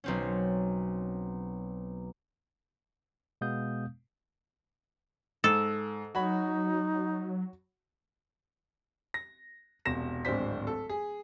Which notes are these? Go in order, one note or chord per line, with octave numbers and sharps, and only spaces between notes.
B1 C4 C#4
B2 G#3 B3 F5 D#6 G6
G#2 A4
F#3 D#4 F#4 C#5 B5
A#6
E1 C2 A#6 E7
D1 G#1 G#3 D4 C5 B6
A4
G#4